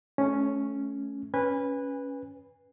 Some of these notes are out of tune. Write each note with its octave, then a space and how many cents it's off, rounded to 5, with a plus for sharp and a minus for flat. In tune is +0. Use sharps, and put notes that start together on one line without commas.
A3 -20 C#4 +0
C#4 +5 B4 -5 G#5 -30